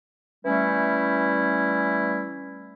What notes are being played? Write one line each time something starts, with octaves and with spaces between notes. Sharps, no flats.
E3 G3 A3 C#4 E4